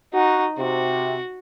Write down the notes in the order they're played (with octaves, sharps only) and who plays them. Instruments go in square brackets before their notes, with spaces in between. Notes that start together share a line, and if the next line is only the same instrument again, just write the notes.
[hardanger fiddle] D#4 [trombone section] F#4
[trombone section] C3 [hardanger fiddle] F#4